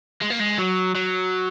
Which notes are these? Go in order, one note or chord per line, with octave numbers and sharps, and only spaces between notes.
G#3
A#3
G#3
F#3
F#3